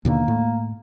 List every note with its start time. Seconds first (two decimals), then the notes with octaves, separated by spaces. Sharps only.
0.05 D#2 B2 D3 A#3
0.28 A2